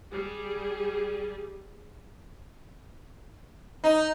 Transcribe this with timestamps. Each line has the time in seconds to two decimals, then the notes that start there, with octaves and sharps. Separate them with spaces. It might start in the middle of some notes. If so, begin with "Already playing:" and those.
0.12 G3 G#4
3.84 D#4